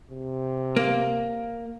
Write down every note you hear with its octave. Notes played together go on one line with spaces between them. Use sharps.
C3
A#3